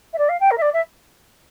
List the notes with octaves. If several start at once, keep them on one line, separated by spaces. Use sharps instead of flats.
E5
D5
F5
G5
A#4
E5
D5
E5